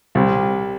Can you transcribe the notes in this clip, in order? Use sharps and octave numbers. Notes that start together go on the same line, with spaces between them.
C2